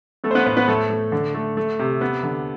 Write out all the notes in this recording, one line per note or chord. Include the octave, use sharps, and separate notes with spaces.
A3 B3 A4
C5
B3 B4
A2 B3 B4
B3 B4
A2 A3 A4
A3
D3
A3
A3
C3
B3
D3